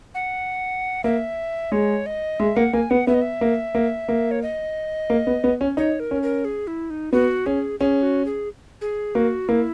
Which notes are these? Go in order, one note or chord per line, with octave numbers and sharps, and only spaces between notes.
F#5
A#3 E5
G#3 C#5
D#5
G#3 E5
A#3 F#5
A#3 G#5
B3 F#5
B3 E5
D#5
E5
A#3
A#3
A#3
C#5
D#5
A#3
B3
B3
C#4
D#4 C#5
A#4
C#4
A#4
G#4
E4
D#4
B3 F#4
C#4 G#4
C#4 G#4
F#4
G#4
G#4
A#3 F#4
A#3 E4